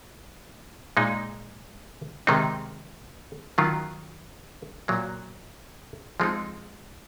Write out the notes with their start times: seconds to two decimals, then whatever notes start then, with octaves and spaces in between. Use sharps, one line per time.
0.97 A#2 G#3 D#4
2.27 C3 D#3 G#3 C4 D#4
3.58 D#3 F#3 C#4 F4
4.88 A#2 F#3 A#3
6.20 F3 G#3 C4 D#4